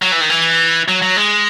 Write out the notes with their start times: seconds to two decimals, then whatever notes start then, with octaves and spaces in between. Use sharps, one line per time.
0.02 F#3
0.12 E3
0.21 D#3
0.30 E3
0.88 F#3
1.02 F#3
1.17 G#3